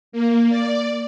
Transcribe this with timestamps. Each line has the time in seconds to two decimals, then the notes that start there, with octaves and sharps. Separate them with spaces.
0.12 A#3
0.50 D5